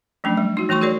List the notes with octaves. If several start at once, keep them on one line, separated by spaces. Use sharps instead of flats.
F3 F#3 A3 C#4 D4
G3
D#4 F#4
E3 A3 F#4 C6 C#6
F#4 G#4 A#4 C#5 D5